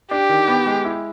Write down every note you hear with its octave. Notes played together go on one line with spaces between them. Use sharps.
D4 G4
D#3
B3
G#3
E4